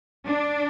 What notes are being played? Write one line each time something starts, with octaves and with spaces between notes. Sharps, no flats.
D4